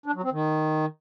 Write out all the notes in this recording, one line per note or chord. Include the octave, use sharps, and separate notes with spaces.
D4
F#3
C4
D#3